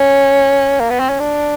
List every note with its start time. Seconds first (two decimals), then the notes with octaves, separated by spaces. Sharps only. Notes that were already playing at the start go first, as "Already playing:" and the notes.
Already playing: C#4
0.80 A#3
0.90 B3
1.00 C4
1.10 C#4
1.20 D4